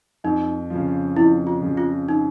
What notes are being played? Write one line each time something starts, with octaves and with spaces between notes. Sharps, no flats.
F2 D#4
C#3 F3
F2 E4
F4
C#3 F3
F4
D#4